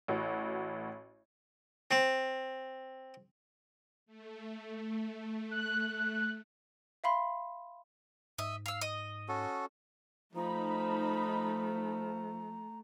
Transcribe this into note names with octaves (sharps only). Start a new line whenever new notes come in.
A1 A2 F#4
C4
A3
F#6
E5 F5 B5 C6
G#2 D#5 E5
F5 E6
D#5
C#4 F#4 A4
F3 A3 D#4 A#5 B5